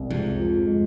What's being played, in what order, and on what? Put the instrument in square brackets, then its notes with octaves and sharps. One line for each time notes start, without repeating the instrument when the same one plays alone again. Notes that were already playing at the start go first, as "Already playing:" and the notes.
Already playing: [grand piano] C2
[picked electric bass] F2 G#2 [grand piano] C3
[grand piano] F3
G#3